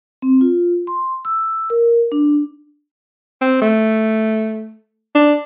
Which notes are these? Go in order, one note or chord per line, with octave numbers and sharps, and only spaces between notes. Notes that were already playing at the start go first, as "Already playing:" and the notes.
C4
F4
C6
E6
A#4
D4
C4
A3
D4